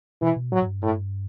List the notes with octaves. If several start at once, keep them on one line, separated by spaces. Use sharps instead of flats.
B2 E3
B2
A2 F#3
A2
G2
A2